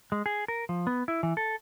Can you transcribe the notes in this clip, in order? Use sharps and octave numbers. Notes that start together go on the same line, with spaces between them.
G#3
G#4
A#4
F3
B3
E4
E3
A4